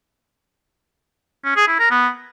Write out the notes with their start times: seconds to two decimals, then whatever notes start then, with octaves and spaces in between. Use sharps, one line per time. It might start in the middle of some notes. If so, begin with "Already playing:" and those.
1.45 C#4
1.56 G#4
1.68 E4
1.79 A#4
1.91 B3